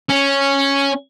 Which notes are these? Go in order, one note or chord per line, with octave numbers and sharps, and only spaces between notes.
C#4